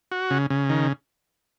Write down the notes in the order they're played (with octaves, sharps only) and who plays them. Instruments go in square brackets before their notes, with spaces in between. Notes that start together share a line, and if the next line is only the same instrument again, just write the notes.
[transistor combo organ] F#4
C#3
C#3
D#3